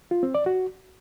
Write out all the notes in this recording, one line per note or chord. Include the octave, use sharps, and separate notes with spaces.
F4
C4
D5
F#4